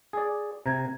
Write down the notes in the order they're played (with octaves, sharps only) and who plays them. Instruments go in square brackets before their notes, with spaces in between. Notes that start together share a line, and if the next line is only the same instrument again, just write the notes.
[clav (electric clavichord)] G#4 D5
[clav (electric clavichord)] C3 [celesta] A#5 G#6